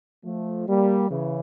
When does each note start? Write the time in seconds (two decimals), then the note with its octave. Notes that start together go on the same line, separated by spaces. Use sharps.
0.25 F3 A3
0.67 G3 A#3
1.09 C#3 E3